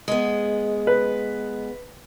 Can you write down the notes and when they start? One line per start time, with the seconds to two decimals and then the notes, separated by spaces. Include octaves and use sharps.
0.08 G#3 B3
0.87 B4